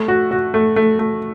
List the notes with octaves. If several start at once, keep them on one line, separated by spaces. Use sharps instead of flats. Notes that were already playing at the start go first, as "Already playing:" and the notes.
Already playing: A3
F#4
F#4
A3
A3
A3